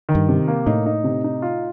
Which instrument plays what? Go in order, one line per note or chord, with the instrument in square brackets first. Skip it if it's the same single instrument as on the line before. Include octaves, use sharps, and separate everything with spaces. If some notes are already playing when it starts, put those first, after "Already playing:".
[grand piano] D#3
[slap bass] G2
[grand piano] C3
A#3
[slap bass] A2 [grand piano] D#4
[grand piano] D#4
C3
D#4
F4